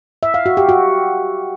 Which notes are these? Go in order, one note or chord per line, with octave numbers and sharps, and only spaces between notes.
E5
F5
F#4
G4
F#4